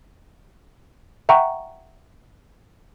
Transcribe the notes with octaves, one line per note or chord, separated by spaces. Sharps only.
E5 F#5 G5 A#5 C#6